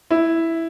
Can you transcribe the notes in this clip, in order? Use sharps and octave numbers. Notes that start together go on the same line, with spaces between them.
E4